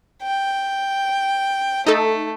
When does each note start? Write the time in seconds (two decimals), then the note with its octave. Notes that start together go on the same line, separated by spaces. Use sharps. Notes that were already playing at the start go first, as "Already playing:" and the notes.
0.23 G5
1.86 A3 D#4 A4